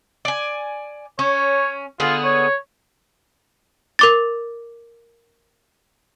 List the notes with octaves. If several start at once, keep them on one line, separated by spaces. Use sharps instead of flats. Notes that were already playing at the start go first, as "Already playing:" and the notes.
D5 G#5
C#4 C#5
D3 B3 F4 G#4
C#5
A#4 D6 A6